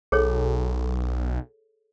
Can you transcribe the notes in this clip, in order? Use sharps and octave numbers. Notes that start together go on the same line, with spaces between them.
B1 G#4 A4 C#5